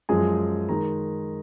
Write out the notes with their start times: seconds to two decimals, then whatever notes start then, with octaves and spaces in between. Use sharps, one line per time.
0.09 F#2 F3 G#3 G#4 G#5
0.69 D#3 G#3 A#5